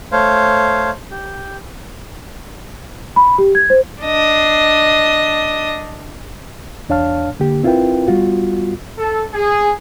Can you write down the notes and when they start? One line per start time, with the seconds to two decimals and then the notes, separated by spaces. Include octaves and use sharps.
0.12 A3 C5 C#5 F5
1.11 G4
3.16 B5
3.38 G4
3.55 G#6
3.70 C5
4.03 D4 D#5
6.89 E2 D4 C#5 F5 A5 F6
7.40 D3 A#3 G4
7.63 C4 E4 F4 A#4 B4 G5
8.08 G3 B3 F4 F#4
8.97 A4
9.33 G#4